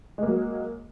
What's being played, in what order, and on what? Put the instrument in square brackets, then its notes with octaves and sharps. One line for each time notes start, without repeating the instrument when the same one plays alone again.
[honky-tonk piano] G#3
A#3
F#3